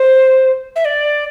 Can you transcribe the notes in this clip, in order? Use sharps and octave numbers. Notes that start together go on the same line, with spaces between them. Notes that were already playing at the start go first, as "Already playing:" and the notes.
Already playing: C5
E5
D5